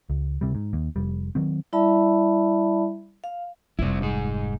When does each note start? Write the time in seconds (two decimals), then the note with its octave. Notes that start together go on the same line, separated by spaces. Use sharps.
0.10 C#2
0.41 C#2 C3 G3
0.55 G#2
0.73 D#2
0.96 F1 G3
1.35 D#3 F#3 C4
1.73 G3 E4 D5 E5 A5 B5
3.24 F5
3.79 F1 G3 C4 E4
4.01 G#2 D#4 G#4